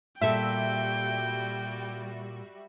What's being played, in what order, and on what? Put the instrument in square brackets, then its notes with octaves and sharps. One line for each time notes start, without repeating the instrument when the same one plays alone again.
[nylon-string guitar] A#2 A4 [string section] G3 F#4 [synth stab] E5 [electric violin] G5